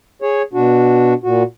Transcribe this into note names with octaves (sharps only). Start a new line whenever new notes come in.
G#4 C#5
B2 D4 F#4
A#2 F#4